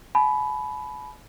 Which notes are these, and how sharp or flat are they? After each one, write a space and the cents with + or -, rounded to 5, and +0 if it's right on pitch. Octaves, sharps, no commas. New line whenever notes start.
G#5 +45 B5 +5